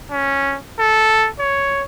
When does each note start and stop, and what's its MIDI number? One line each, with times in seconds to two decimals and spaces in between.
0.11 0.57 61
0.79 1.28 69
1.40 1.84 73